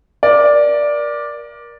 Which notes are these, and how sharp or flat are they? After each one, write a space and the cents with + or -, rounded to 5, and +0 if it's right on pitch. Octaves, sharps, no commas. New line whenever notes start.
A#4 +25 D5 +0